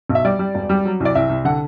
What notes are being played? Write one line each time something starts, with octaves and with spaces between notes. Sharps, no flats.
B1
E5
G3 D5
G3
E1
G3
F#3
C2
D5
C2 E5
C2
D3 F#5